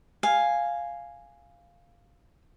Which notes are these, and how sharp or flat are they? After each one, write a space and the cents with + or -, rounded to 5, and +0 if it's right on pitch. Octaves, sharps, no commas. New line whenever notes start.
F5 +0 G#5 +0